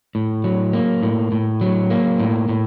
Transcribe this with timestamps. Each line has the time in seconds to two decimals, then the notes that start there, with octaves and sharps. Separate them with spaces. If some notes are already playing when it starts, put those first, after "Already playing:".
0.15 A2
0.44 F#3
0.73 A#3
1.03 A2
1.32 A2
1.61 F#3
1.90 A#3
2.20 A2
2.49 A2